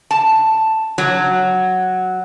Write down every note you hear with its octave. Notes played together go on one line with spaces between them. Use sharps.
A5
F#3